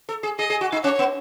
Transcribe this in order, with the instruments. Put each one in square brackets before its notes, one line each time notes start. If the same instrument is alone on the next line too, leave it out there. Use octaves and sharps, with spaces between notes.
[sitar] A4
G#4
[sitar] G#4 [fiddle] D#5
[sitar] G#4
F#4
D#4
[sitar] C#4 [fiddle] C#5
[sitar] B3